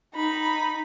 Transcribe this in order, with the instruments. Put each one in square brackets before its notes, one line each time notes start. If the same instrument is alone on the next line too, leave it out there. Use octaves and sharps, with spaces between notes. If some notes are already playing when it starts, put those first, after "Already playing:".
[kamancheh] D#4 B5